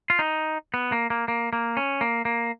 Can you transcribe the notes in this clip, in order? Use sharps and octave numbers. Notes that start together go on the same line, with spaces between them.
F4
D#4
B3
A#3
A#3
A#3
A#3
C#4
A#3
A#3